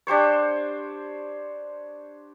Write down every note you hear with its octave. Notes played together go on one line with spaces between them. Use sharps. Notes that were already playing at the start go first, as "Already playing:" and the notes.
D4 G4 C5 C#5